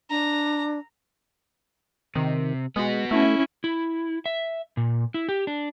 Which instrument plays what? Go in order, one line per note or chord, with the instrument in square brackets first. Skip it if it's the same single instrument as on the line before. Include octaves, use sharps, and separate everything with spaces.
[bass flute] D4 [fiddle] A#5
[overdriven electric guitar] C3 [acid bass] D#3
[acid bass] G#3 [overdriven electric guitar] B3 F#4
[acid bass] A3 [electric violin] C#4 E4
[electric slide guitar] E4
E5
A#2
E4
G4
D4